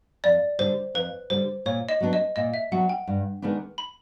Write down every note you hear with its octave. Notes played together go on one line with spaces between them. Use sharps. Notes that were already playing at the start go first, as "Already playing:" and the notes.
F2 D5
D3 G3 C5
F2 B4
D3 G3 C5
A#2 C#5
D#5
F#3 B3 D4
D#5
A#2 D#5
E5
F#3 B3 D4 F#5
G5
G2
D#3 G#3 B3 D4
B5